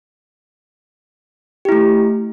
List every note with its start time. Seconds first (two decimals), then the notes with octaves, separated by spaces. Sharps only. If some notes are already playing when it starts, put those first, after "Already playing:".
1.65 G4
1.69 E4
1.72 A3